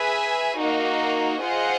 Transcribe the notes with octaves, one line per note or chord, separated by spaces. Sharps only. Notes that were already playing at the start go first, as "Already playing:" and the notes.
Already playing: G#4 B4 E5 G#5
A#3 D#4 F#4 A#4 D#5
F4 G#4 C5 D#5 F#5